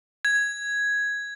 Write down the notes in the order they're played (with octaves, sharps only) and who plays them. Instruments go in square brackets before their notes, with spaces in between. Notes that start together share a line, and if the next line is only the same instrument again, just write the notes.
[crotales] G#6